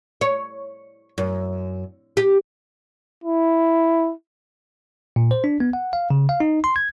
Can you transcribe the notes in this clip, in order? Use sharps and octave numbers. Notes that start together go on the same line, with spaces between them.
C#5
F#2
G4
E4
A#2
C5
D4
B3
F#5
F5
C#3
F5
D#4
C6
G#6